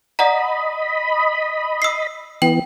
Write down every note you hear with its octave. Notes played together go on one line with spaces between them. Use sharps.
D5 D#5 F#5 A#5 B5
E6 C7
E3 B3 G5 F#7